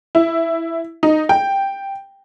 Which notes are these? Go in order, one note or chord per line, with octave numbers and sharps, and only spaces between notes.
E4
D#4
G5